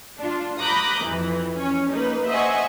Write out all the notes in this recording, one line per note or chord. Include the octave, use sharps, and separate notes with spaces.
D4 F4
A#5 B5 D6 D#6 F#6 G6
F2 E3
C#4 C#5
A#3 D#4 B4
C5 D#5 E5 F#5 G#5 C#6